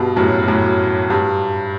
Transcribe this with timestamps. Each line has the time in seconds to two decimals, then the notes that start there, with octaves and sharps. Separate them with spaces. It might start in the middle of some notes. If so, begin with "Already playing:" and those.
Already playing: G2 B2
0.17 F#2 A2
0.48 F#2 A2
1.10 G2